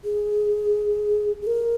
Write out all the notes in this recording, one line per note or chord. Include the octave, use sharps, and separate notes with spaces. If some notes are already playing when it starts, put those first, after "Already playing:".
G#4
G#4
A#4